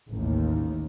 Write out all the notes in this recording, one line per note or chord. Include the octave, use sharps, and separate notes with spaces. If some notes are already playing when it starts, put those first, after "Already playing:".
A1 D#2